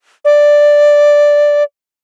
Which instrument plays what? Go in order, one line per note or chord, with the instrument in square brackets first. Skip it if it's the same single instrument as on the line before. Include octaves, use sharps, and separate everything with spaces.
[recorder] D5